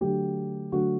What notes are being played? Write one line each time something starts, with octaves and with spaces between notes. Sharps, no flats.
D3 F#3 A3 G4
D3 F#3 A3 F#4